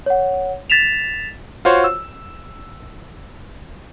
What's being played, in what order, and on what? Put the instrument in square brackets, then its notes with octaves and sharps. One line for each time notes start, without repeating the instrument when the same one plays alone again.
[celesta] C#5 F#5
A6 B6 E7 F7
[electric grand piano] F4 F#4 C5 C#5
E6